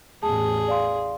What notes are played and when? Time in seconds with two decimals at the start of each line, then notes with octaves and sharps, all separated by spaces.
0.23 A1 E2 G#4 A5
0.68 D5 F5 C6